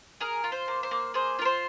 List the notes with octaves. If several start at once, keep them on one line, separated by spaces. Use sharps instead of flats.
G#4 A#4
F4
C5
A#3
C5
A#3
G#4 C5
F4 A#4
C5